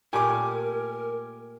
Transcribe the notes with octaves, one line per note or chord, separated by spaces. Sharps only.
A#2 A3 G4 A#4 G#5 D6